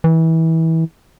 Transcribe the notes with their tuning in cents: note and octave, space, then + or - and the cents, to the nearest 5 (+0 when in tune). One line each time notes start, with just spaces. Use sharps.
E3 -25